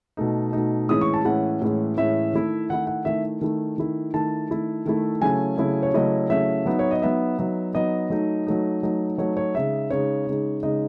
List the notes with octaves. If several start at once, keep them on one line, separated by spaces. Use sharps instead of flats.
B2 A3 D#4
B2 A3 D#4
A2 E3 G#3 C#4 E4 D#6
C#6
A5
A2 E3 G#3 C#4 E4 F#5
A2 E3 G#3 C#4 E4
A2 E3 G#3 C#4 E4 E5
D#3 A3 E4
D#3 A3 E4 F#5
F#5
D#3 A3 E4 E5
D#3 A3 E4
D#3 A3 E4
D#3 A3 E4 A5
D#3 A3 E4
D#3 A3 E4
C#3 F#3 A3 C#4 E4 G#5
C#3 F#3 A3 C#4 E4
C#5
C#3 F#3 A3 C#4 E4 D#5
C#3 F#3 A3 C#4 E4 E5
F#3 B3 D#4
C#5
D#5
F#3 B3 D#4 E5
F#3 B3 D#4
F#3 B3 D#4 D#5
F#3 A3 D#4
F#3 A3 D#4
F#3 A3 D#4
F#3 A3 D#4 C#5
C#5
C#3 G#3 D#4 E5
C#3 G#3 D#4 C#5
C#3 G#3 D#4
C#3 G#3 D#4 D#5